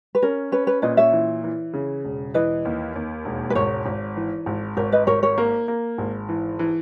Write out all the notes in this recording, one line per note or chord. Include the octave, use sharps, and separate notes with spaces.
B4
C#4 A#4
C#4 B4
B4
A#2 B4 D#5
C#5 E5
E3
E3
C#3
E1
E3 B4 D#5
D#2
D#2
E1
B4
G#1 A#4 C#5
G#1
E3
G#1
G#1 A#4 C#5
B4 D#5
G#1 A#4 C#5
A#4 C#5
A#3 A#4
A#3
G#1
E3
E3